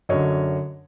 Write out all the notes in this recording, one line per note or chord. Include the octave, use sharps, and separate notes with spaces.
F#2 D3 C#5 D#5